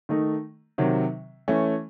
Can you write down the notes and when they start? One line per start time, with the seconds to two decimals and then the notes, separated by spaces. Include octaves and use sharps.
0.09 D#3 A3 D#4
0.78 C3 D#3 F#3
1.48 E3 A3 C#4